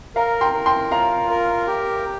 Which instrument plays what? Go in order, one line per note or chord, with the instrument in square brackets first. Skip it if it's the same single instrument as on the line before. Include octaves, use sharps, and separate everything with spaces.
[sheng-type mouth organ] A#4 [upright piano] F5 A#5
[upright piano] G5 C6
[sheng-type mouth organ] A#4
[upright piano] G5 C6
[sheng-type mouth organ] F4 [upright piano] F5 A#5
[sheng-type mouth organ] A#4
G4